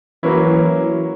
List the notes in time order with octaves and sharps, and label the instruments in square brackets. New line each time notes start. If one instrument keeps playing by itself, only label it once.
[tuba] E3 [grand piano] F#3 A#3 C#4 E4